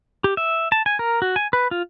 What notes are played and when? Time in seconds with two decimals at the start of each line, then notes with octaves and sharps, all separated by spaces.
0.24 G4
0.37 E5
0.72 A5
0.86 G#5
0.99 A#4
1.22 F#4
1.36 G#5
1.53 B4
1.71 F4